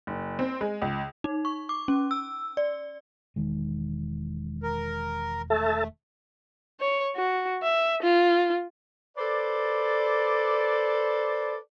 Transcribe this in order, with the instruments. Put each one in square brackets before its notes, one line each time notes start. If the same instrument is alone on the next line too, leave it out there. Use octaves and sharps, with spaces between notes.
[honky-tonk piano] F#1
C4
G#3
C#2
[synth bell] D#4
C#6
D6
C#4
E6
D5
[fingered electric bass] E1 D#3 G#3
[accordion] A#4
[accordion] A3 [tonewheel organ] A4 E5 A5
[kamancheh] C#5
F#4
E5
F4
[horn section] A4 B4 C5 D5